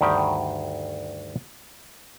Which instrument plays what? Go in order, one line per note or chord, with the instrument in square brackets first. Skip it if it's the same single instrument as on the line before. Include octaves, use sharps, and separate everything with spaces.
[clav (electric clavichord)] D2 G2 D#3 G4 G5